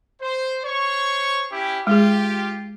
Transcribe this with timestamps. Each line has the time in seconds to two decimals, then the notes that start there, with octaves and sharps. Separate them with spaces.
0.22 C5
0.65 C5 C#5 C#6
1.52 C#4 E4 G4
1.87 G#3 F4 G4 G#4